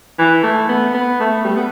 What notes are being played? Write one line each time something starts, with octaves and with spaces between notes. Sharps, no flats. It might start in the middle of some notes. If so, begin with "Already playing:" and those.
E3
A3
B3
B3
A3
G3
B3